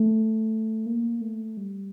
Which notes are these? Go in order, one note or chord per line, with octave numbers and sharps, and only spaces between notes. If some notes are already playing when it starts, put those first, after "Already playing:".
Already playing: A3
A#3
A3
G3